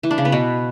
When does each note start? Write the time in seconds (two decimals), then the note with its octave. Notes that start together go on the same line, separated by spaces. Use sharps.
0.03 E3
0.11 D4
0.18 C#3
0.25 B3
0.32 B2